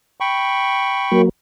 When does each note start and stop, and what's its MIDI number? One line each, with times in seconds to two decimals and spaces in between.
0.21 1.22 79
0.21 1.22 83
0.21 1.22 85
1.12 1.29 54
1.12 1.29 58